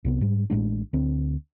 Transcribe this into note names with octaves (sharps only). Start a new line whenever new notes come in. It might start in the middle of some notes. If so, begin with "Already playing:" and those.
C2 C3 B3
G#2 G3
A1 A2 G#3 D4
D2 C4